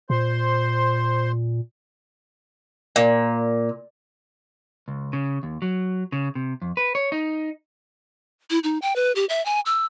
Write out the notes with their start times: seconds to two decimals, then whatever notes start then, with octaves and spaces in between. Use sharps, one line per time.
0.10 A#2 C5 C6
2.96 A#2
4.88 C#2
5.13 C#3
5.43 D#2
5.62 F#3
6.12 C#3
6.35 C3
6.62 F2
6.77 B4
6.95 C#5
7.12 D#4
8.51 E4
8.64 D#4
8.82 G5
8.96 B4
9.16 G4
9.29 E5
9.46 G#5
9.66 E6